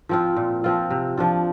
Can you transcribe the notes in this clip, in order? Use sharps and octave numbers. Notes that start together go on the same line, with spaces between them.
F3 C4 F4
A#2
F3 C4 F4
C3
F3 D4 F4